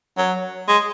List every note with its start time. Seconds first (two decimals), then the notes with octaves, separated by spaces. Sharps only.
0.18 F#3
0.68 G#3